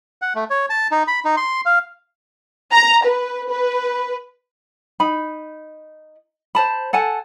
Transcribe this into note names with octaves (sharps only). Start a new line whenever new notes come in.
F#5
A3
C#5
A5
D#4
B5
D#4
C6
F5
A#5
B4
B4
D#4 B5
C5 A5 B5
A4 F#5 G#5 A5